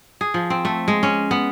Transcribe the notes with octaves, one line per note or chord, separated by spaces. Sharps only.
G#4
F3
C4
A3
G#3
C#4
B3